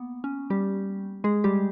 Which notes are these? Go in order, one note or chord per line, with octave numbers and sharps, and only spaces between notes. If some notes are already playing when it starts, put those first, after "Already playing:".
Already playing: A#3 B3
C#4
G3 G4
G#3 G#4
G3 G4